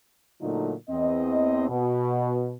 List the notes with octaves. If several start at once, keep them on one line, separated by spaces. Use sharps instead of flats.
A#2 D3 F#3 A3 D#4 F4
E2 C4 D#5
B2